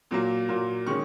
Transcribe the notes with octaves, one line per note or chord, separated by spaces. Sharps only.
A#2 F#3 A#3
A#2 F#3 A#3
D#3 G#3 C#4 C#6